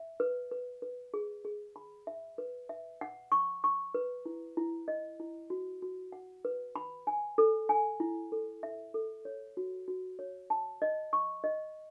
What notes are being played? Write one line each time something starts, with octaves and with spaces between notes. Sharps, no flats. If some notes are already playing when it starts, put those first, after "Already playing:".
Already playing: E5
B4
B4
B4
G#4
G#4
B5
E5
B4
E5
F#5
C#6
C#6
B4
E4
E4
D#5
E4
F#4
F#4
F#5
B4
B5
G#5
A4
G#5
E4
A4
E5
A4
C#5
F#4
F#4
C#5
A5
D#5
C#6
D#5